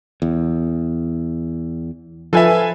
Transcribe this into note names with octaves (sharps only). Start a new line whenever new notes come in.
E2
F3 F4 A4 B4 E5 G#5